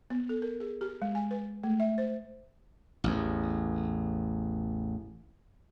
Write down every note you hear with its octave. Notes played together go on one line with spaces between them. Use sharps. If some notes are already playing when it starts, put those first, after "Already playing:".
B3
A4
A#4
G#4
G4
G#3
G#5
B4
A3
E5
C5
A1 E2